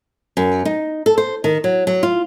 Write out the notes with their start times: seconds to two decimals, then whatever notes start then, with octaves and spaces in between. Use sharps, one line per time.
0.37 F#2
0.65 D#4
1.06 A4
1.18 C5
1.44 D#3
1.64 F#3
1.87 F#3
2.03 F4